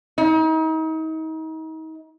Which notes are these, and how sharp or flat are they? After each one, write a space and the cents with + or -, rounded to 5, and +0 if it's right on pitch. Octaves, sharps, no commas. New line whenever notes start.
D#4 +35